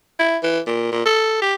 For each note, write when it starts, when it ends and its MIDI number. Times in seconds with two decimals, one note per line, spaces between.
0.19 0.37 64
0.43 0.60 52
0.67 0.88 46
0.92 1.03 46
1.05 1.39 69
1.41 1.54 67